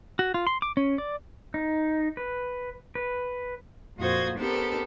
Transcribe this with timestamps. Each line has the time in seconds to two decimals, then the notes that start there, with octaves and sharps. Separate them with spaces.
0.19 F#4
0.34 F4
0.47 C6
0.62 D6
0.77 C#4
0.98 D5
1.54 D#4
2.17 B4
2.95 B4
3.98 F2 A#2 F#4 C5 D#6 G#6
4.38 B3 C4 D4 G4 A4 A#4